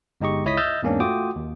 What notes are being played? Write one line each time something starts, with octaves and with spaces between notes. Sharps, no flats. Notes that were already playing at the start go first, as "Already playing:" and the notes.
G1 G#3 D#4 G4 D#5 C#6
C#2 E4 C#5 D#5 D#6 B6
D#5 E5 E6 F6 G6 A6
E2 G#2 A#3 C#4 D4
A3 F4 F#4 G5 D6 D#6
D#2